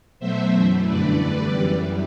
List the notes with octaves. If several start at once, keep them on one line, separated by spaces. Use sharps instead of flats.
B2 F#3 A3 C5 E5
F#2 E3 A3
G2 D3 A3 B4 D5
E2 D3 G3 B4 D5
F#2 E3 G3